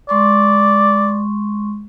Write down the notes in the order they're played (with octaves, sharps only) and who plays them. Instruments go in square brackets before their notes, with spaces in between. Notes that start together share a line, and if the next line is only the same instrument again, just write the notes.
[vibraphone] G#3 C6 C#6 [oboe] D5